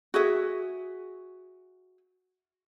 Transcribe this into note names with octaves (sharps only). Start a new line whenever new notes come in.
F#4 G#4 E5